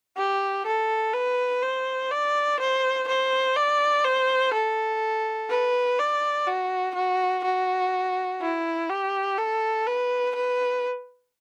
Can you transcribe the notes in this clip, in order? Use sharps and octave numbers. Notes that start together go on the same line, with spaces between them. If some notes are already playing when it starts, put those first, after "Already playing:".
G4
A4
B4
C5
D5
C5
C5
D5
C5
A4
B4
D5
F#4
F#4
F#4
E4
G4
A4
B4
B4